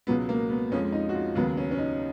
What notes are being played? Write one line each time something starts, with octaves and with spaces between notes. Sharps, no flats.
C#2 B2 F#3 B3
A#3
B3
F2 F3 G#3 C#4
D#4
F#4
F4
D#2 C#3 F#3 B3
C#4
C#4
D#4